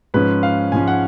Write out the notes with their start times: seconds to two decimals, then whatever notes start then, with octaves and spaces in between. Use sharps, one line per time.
0.14 G#2 F3 G#3 C#4 B4
0.43 F5
0.72 G#2 F3 G#3 C#4 G#5
0.88 F#5